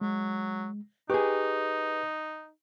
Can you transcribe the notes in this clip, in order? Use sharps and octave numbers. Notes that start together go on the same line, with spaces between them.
F#3 G#3
D#4 G4 G#4 B4 C#6 F#6